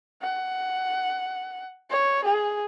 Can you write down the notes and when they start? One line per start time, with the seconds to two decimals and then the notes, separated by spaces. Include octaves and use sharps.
0.22 F#5
1.90 C#5
2.24 G#4